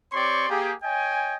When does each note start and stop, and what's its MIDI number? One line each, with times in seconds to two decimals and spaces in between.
0.13 0.48 60
0.13 0.48 67
0.13 0.48 73
0.13 0.48 74
0.13 0.48 84
0.13 0.48 85
0.49 0.73 58
0.49 0.73 67
0.49 0.73 68
0.83 1.37 73
0.83 1.37 75
0.83 1.37 79
0.83 1.37 80